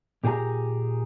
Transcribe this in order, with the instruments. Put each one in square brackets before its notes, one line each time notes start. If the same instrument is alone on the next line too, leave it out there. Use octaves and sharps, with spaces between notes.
[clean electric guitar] A#2 G4 G#4 C#5 A#5